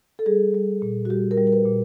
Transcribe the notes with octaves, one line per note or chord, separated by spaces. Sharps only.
A4
G3 G#4
G3
A#2
F#4
G3 G4
A#4
G3
A#4
B4
A#2